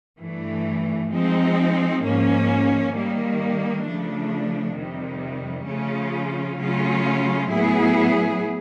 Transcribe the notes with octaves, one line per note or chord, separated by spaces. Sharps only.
G2 E3 A3
F3 G#3 C4 D#4
G#2 F3 A#3 C#4
D#3 G3 A#3
C#3 F3 A3 D4
F2 C3 D#3 G3
C#3 F3 A3 C#4 F4
C#3 F#3 A3 C#4 F4
A2 F#3 B3 E4 G#4